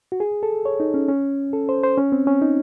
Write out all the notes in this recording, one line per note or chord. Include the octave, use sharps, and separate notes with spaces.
F#4
G#4
A4
C#5
D#4
C#4
C#4
A4
C5
C5
C#4
C4
C#4
D#4